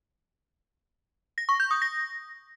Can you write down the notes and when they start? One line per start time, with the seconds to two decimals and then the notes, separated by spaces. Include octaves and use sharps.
1.38 A#6
1.49 C#6
1.60 G6
1.71 D#6
1.82 A#6